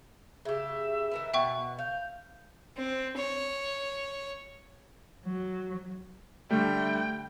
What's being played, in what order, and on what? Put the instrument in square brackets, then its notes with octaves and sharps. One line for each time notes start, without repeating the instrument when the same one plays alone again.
[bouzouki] C#3 G4 [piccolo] E5
[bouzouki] D#3 A#4 B4
[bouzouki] B2 [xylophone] E5 G5 C#6 [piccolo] F#5
[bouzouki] F5 [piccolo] G6
[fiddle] C4
C#5
[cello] F#3
[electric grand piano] D3 G3 [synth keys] A3 [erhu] G5